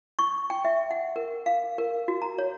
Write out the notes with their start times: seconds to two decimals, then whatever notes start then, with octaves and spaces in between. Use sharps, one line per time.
0.19 C#6
0.50 G5
0.65 E5
0.91 F#5
1.16 A#4
1.46 F5
1.78 A#4
2.08 F#4
2.22 A#5
2.38 C#5